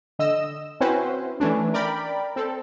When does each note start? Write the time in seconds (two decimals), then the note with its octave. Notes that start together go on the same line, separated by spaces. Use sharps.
0.19 D3 D#5 E6 E7
0.80 C4 C#4 E4 F#4 B4 C5
1.40 E3 A3 C#4 D4
1.74 A#4 D5 G5 B5
2.36 C4 A4